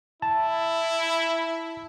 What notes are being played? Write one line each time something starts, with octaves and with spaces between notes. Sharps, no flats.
E4 A5